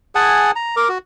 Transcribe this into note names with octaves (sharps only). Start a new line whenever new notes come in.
G#4 F#5 G#5 A5
A#5
A#4 D6
F#4